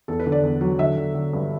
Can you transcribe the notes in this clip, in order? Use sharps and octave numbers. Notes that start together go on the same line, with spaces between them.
E2 A4
B4
D3
D5
E2
F#3
D3 E5
D3
D3
G2